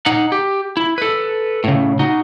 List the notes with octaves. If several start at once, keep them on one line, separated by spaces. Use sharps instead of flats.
D#4 F#5
G4
E4
A4 B4
A2 C#3
D#4 F#4